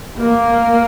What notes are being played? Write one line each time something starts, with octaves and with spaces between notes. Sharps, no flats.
A#3